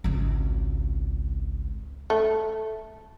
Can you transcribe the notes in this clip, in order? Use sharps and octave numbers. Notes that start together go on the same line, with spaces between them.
G#1 C#2
A3